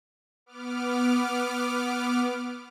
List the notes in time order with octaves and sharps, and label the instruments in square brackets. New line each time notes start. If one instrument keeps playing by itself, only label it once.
[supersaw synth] B3 D6 F6